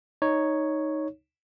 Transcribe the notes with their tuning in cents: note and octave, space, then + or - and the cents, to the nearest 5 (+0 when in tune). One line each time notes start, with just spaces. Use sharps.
D#4 +0 C#5 +0